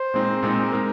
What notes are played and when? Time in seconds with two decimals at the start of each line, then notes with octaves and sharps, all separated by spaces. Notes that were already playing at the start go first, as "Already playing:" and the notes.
Already playing: C5
0.14 A#2 G#3 C4 D#4
0.43 A#2 G#3 C4 D#4
0.72 G#3 D#4 A#4